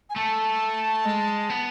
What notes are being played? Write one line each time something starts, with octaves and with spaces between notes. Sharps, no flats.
G#5
A3 A5
G#3
B3